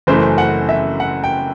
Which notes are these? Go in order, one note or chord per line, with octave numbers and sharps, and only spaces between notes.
F#1 F#2 E3 A3 C5
F#5
E5
F#5
G5